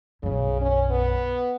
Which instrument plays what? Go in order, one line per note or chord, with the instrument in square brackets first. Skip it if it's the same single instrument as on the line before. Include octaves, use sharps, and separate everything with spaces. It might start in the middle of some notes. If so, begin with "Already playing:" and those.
[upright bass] B1 F#2 [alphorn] C#3
[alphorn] C#4
B3